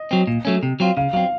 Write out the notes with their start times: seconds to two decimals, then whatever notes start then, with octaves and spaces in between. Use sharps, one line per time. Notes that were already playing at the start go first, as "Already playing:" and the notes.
Already playing: D#5
0.11 F#3 C4
0.27 A#2
0.45 F#3 A3 C#4
0.63 C3
0.80 F#3 C4 F4
0.97 C#3 F5
1.13 F#3 C4 F5